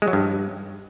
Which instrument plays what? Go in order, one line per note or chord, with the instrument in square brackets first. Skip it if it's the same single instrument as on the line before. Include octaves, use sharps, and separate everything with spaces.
[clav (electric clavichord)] G#3
F#3
G2